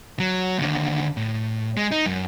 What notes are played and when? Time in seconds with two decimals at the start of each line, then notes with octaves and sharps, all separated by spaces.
0.19 F#3
0.59 D#2 D3
1.17 A2
1.77 G#3
1.91 D#4
2.06 F#2